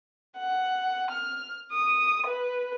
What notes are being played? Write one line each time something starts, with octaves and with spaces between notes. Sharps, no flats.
F#5
F6
D#6
B4